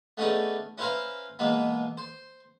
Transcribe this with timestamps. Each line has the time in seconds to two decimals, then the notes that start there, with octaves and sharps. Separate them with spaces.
0.17 A3 B3 C#4 D#4 G#4 D5
0.78 C#4 E4 B4 C5 F5 A#5
1.39 B2 E3 G#3 A#3 B3
1.97 C5